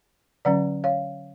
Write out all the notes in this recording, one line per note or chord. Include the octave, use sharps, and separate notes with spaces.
D3 F#3 C#4 D5 F#5
C#5 F5